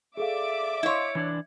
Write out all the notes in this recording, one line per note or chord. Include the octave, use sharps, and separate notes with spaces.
G#4 A4 D5 E5 F5 D6
E4 C#5 D#5 F5 C6
E3 D4 D5 G#6